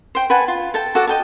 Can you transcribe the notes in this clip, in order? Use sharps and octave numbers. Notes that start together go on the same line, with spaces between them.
C5 G5
B4 F#5 G#5 A5
F4
A4 G5 A5
F#4 A4 D5 F#5
D#5 G5 A5